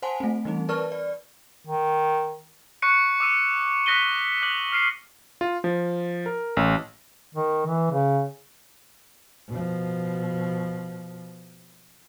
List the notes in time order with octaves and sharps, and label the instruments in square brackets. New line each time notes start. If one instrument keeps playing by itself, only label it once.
[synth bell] C5 F#5 G#5 A5 C6
A3 C4
E3 G3 C4 D#4
A#4 B4 D5 A5 C#6 F6
D5
[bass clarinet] D#3
[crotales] C#6 F#6 C#7 D#7
D6 E6 D#7
D#6 F#6 A#6 B6 D#7 G7
D6 F#6 F#7
F6 C7 D#7
[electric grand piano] F4
F3
A#4
A1
[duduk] D#3
E3
C#3
[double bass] B2 F3